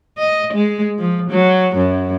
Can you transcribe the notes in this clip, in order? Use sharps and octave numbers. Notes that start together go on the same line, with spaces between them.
D#5
G#3
F3
F#3
F#2